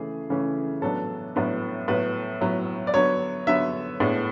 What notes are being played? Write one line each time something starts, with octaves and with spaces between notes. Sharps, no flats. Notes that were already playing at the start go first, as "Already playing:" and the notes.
Already playing: C#3 E3 A3 C#4 G#4
C#3 E3 A3 C#4
A2 F#3 B3 D4 A4
A2 F#3 B3 D4
A2 F#3 B3 B4
A2 F#3 B3
D5
D3 F#3 B3 C#5
D3 F#3 B3 E5
A2 G#3 B3 D4